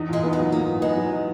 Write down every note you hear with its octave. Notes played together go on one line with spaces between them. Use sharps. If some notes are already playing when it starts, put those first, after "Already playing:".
Already playing: E2 D#4
A#2 G#3
B3
G#3
F#3
A#3 D#4
A#2
G#3 B3
F#3